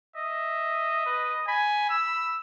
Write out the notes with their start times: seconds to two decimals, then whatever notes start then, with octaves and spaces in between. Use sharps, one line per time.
0.16 D#5 E5
1.06 B4
1.48 G#5 B5
1.90 E6